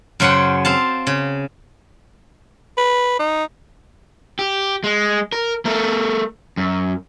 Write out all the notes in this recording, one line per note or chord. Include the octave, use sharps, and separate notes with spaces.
F#2 C#3 C#4 C5 F#5 G5
C4 F5 A5
C#3
B4
D#4
G4
G#3
A#4
A3 A#4
F#2